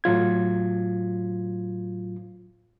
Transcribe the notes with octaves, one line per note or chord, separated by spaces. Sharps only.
A2 F#3 F4 G#6